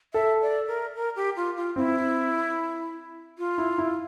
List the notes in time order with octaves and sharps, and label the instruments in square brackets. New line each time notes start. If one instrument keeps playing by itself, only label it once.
[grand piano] A4 [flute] E5
[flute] D5
A#4
A#4
G4
F4
F4
[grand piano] C4 [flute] E4
[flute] F4
[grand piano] E4
E4